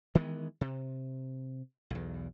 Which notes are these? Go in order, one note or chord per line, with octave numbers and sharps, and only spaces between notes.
D#3 E3 G#3 B3
C3
B1 E2